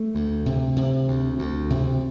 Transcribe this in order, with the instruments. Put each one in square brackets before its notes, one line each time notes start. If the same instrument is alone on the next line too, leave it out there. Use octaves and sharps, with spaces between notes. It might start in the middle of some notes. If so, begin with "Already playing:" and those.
Already playing: [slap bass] A3
D2
C3
C3
D2
D2
C3